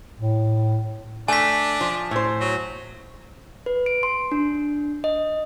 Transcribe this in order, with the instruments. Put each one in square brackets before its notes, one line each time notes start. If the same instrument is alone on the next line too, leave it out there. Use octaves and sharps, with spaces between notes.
[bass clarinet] A2
[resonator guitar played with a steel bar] A3 [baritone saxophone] D4 [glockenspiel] G#5 B6
[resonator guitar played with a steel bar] F3
A2 C5
[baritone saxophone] F#3
[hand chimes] B4
D7
C6
D4
D#5